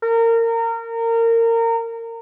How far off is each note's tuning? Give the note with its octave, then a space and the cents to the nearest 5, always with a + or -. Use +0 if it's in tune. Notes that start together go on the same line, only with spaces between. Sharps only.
A#4 -25